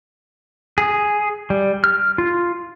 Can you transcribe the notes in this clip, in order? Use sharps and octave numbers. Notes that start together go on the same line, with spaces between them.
G#4
G3
F6
F4